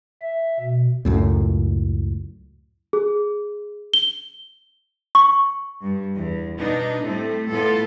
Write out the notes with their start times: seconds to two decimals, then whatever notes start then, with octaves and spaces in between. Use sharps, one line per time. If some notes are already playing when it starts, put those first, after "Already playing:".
0.22 E5
0.60 B2
1.05 C#2 F#2 A2
2.93 G#4
3.94 G7
5.15 C#6
5.82 G2
6.17 E2
6.57 B2 B3 D4 D#4
7.04 A2 G3 A3 C4
7.50 A2 B3 F4 A4